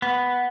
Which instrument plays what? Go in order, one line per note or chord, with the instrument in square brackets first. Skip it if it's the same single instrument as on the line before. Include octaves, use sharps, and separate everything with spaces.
[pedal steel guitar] B3